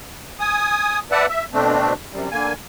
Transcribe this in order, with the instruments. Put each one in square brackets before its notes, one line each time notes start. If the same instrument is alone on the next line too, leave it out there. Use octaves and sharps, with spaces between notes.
[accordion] G#5 D#6
B4 D5 E5 F#5 A5
E5
B2 A3 C4 D4
F#2 C3 G3
D3 A#3 G#5